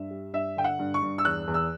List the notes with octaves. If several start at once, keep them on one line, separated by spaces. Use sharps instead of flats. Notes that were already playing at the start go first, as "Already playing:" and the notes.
Already playing: G2 E5
G3
G2 E5
D3 G5
F#5
G2
C#6
G2
E6
E2 F#6
E2
E6